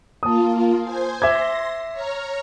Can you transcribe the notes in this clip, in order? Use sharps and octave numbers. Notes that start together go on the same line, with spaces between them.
A#3 F4 A5 D#6
C5 G#5
E5 C6 D6 G#6 A#6
C#5 A#5 F6